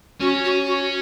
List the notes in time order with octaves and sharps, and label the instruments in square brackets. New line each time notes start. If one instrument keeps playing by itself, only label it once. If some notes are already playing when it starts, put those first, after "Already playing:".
[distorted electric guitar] C#4 [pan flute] F#4
[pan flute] F#4
F#4